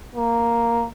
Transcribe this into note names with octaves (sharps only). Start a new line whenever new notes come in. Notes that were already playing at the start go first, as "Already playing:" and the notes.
A#3